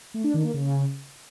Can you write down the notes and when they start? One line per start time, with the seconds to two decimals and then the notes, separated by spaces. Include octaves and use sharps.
0.14 A3
0.24 D4
0.34 D#3
0.44 A#3
0.54 C#3